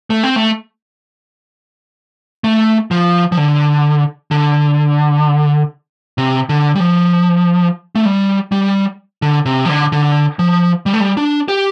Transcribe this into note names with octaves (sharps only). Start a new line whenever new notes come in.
A3
C4
A3
A3
F3
F3
D3
D3
C3
D3
G3
F3
A3
G3
G3
D3
C3
F3
D3
D3
F3
G3
A3
G3
D4
G4